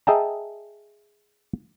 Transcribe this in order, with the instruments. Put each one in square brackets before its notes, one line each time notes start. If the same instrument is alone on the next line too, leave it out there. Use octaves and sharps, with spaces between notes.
[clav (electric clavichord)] G#4 D#5 E5 G5 A5 A#5